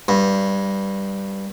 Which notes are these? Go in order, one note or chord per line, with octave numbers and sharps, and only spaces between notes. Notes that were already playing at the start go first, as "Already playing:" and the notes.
G2